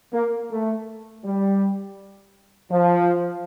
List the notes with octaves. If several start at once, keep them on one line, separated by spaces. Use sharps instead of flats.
A#3
A3
G3
F3